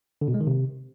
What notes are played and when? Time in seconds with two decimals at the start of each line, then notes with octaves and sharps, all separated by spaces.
0.21 D3
0.28 B2
0.34 G#3
0.41 D#3
0.47 C3